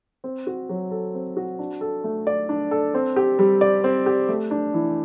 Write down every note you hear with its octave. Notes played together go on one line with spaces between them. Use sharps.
C4
F#4
F#3
A4
C4
F#4
D4
A4
A3
D5
D4
A4
C4
G4
G3
D5
C4
G4
A3
D4
E3